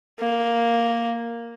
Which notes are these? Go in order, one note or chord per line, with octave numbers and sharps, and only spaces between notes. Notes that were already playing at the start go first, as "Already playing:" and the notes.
A#3